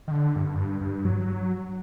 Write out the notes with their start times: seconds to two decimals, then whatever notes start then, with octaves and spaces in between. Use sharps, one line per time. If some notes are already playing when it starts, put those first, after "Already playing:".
0.08 D#3
0.11 D3
0.36 G2
0.54 F#2
0.58 G2
0.81 G2
1.05 F#3
1.28 F#3